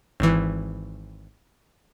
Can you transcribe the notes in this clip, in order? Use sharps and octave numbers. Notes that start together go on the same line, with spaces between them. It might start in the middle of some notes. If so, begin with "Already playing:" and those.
G#1 E3